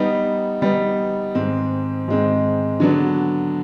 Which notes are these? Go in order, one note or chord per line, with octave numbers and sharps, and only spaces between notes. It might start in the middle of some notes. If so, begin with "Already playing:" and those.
Already playing: G3 B3 D#4
G3 B3 D#4
G#2 D#3 G#3 C4
G#2 D#3 G#3 C4
D3 F#3 B3 D4